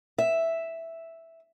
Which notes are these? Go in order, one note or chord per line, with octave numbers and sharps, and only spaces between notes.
E5